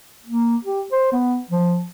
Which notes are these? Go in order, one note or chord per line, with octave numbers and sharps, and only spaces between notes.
A#3
G4
C5
B3
F3